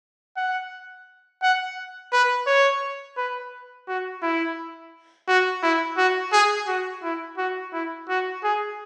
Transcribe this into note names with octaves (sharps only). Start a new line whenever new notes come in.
F#5
F#5
B4
C#5
B4
F#4
E4
F#4
E4
F#4
G#4
F#4
E4
F#4
E4
F#4
G#4